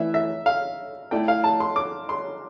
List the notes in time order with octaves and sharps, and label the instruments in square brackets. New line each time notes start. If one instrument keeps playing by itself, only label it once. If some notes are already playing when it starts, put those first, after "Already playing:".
Already playing: [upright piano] E3 A3 E4 B4 D5 [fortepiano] E5
[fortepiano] E5
F5
[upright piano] A3 E4 A4 D5 [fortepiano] G5
[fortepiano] F5
A5
C6
D6
C6